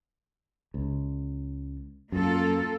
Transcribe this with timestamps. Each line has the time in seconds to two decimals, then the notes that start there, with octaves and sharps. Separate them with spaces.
0.74 C#2
2.12 F#2 A#3 F4 A4